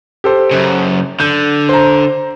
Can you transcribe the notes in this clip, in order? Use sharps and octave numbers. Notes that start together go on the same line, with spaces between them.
G4 A4 C5
F#2 C#3
D3 G6
C5 A#5